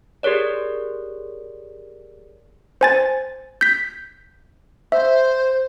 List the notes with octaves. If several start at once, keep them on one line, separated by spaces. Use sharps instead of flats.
G4 G#4 A#4 C#5 D5
C5 G#5 A6
G6 B6
C5 E5